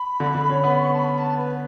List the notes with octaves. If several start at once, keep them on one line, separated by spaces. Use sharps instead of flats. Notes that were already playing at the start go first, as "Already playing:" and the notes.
Already playing: B5
D3
D3
C#4
B3
C#6
A5
B5
A5
B4